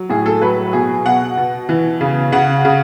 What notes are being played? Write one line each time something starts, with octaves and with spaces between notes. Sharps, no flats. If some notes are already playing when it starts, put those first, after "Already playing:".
Already playing: F#3
A2 G#4
A4
F#3 B4
B2 G#4
B2 F#5
B2
E3
C#3
C#3 F#5
C#3